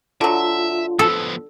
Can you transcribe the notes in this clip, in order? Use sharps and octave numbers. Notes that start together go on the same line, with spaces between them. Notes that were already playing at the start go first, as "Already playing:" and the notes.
D3 F#3 F4 E5
F3 B3 A4